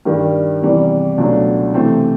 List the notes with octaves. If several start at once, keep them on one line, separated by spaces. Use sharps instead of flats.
G2 D#3 G3
E2 C3 E3 G3
C#2 B2 F#3 A3 D4
C3 E3 A3 C4